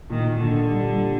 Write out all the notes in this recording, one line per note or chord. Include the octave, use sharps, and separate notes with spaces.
A#2 D#3
A#2
D3
D4
G3
G3